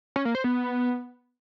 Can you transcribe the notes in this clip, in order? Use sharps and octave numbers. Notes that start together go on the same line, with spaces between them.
C#4
A#3
C5
B3